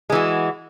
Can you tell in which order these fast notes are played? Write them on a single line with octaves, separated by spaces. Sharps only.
G#3 E3 F#4